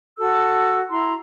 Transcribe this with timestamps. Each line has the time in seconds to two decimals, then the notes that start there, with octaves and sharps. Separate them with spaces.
0.18 F#4 A4 E6
0.91 E4 A#5 C6